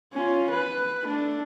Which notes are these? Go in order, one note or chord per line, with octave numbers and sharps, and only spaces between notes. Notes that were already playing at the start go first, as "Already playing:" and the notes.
C#4 F4
B4
A3 D4